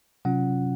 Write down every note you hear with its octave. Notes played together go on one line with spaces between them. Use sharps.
C3 F#3 C#4 F4 F#5